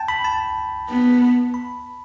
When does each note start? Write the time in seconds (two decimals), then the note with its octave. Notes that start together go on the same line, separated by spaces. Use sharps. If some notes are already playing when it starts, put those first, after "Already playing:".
Already playing: G5 A5
0.08 B5
0.24 A5
0.89 B3
1.54 B5